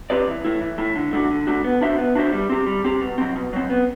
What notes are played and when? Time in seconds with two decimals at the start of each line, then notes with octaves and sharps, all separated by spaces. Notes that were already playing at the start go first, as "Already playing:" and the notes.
0.10 C4 G4 B4 D5
0.27 E3
0.44 A3 E4
0.61 E3
0.78 A3 E4
0.96 D3
1.13 A3 D4 F#4
1.30 D3
1.47 A3 D4 F#4
1.64 B3
1.81 D4 F#4 C5 E5
1.99 B3
2.15 D4 F#4 C5 E5
2.32 G3
2.49 C4 G4
2.67 G3
2.84 C4 G4
3.01 B2
3.18 F#3 C4
3.36 B2
3.53 F#3 C4
3.70 B3